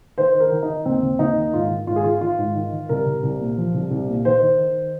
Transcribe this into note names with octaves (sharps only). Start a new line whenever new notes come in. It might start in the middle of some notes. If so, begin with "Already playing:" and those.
D#3 C5
D#3
A#4
D#3
D#4
D#3
D#2 C4
D#2
D#2 D#4
D#3
G#2 F4
D#3
G#2 F4
G#4
D#3 F4
D#3 F4
G#2
D#3
D#3
C2 A#4
C2
C2
A#2
F3
C2
C2
A#2
D#3 C5
D#3
D#3